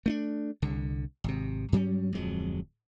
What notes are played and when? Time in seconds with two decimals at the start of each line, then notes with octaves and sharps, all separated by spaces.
0.06 A3 C#4 D4
0.62 C2 D3
1.24 G#1 C3
1.72 G2 F#3 G3 C#4
2.15 D1 F2 F#3 G#3